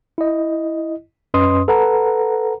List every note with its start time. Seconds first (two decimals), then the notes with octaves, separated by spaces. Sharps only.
0.18 E4 D#5
1.34 F#2 C#4 B4 D#5 C6 D#6
1.68 A4 B4 F#5 A#5